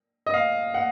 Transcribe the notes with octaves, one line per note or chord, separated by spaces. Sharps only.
D#5
F5
F#5